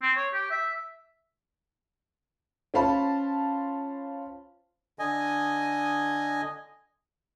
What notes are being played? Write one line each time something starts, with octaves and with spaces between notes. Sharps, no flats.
C4
C#5
G4
E5
C#4 F4 C5 F5 A5 B5
D3 D#5 G#5